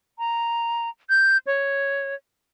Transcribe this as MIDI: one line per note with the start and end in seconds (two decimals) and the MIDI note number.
0.19 0.89 82
1.09 1.37 91
1.47 2.15 73